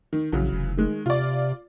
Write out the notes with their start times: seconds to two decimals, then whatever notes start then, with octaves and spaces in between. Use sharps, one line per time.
0.13 D#3
0.32 A#1 C#3 E3 F#3
0.52 F1
0.77 D#3 G#3
1.06 C3 F4 D5